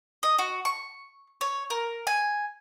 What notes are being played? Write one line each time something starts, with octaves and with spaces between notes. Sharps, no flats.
D#5
F#4
C#6
C#5
A#4
G#5